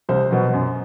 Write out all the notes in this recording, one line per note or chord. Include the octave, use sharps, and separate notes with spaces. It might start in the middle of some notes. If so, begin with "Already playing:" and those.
C2 C5
B2 F#3
F#2